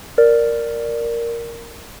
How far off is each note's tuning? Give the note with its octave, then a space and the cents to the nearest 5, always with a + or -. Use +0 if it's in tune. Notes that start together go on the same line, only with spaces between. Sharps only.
A#4 +0 D5 +0